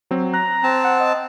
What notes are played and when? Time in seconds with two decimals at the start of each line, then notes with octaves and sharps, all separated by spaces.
0.11 F#3 C4
0.34 A#5 F#6
0.63 C4 A5
0.84 F#5
1.00 D#5